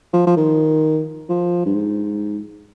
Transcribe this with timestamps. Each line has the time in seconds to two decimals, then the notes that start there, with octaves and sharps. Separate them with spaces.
0.13 F3
0.27 F3
0.37 D#3
1.29 F3
1.66 G2
1.75 G#2